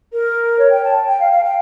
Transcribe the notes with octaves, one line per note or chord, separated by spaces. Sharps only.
A#4
C#5
G5
A5
G5
F5
F5
G5